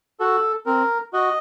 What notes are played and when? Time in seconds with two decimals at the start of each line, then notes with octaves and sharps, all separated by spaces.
0.20 F#4 A4
0.66 C4 A#4
1.13 F#4 D#5